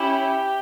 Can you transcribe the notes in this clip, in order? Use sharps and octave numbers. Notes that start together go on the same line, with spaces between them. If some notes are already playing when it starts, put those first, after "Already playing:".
Already playing: C#4 E4 G4